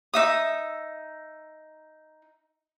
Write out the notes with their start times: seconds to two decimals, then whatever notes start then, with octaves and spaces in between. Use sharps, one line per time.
0.14 D#4 E5 D#6